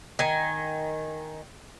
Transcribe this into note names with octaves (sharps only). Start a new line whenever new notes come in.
D#3 G#5